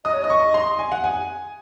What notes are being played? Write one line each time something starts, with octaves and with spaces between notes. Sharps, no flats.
D#5 D#6
C#5
D#5 D#6
C#6
C6
G#5
F#5
G#5